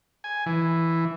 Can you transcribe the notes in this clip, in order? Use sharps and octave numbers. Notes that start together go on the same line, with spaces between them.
G#5
E3